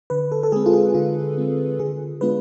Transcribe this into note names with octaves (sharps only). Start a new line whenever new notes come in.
D3 B4
A4
A4
G#3 C4 G#4
F4
G#4
D3 F4
G#3 C4
D3 G#4
G#3 B3 D4 F4 B4